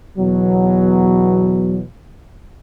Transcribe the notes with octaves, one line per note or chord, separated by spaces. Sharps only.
E2 B2 F#3